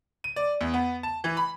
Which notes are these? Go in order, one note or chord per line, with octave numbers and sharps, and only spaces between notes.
D#7
D5
E2
B3
A5
E3
B5